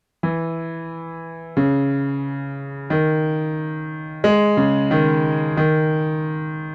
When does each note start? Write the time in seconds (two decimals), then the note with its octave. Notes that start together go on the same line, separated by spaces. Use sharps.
0.23 E3
1.57 C#3
2.90 D#3
4.24 G#3
4.57 C#3
4.91 D#3
5.57 D#3